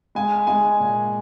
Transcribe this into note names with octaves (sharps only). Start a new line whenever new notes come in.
G#3 G#5
G#3 G#5
A#2